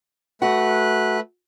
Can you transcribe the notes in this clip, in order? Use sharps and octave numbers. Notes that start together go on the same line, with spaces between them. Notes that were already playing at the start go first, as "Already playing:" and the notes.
A3 F#4 B4 F#5 F#6